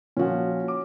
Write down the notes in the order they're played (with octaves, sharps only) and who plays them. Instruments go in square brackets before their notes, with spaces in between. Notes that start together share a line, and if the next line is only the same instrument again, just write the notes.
[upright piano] A#2 F3 [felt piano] C#4 F#4
[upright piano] D6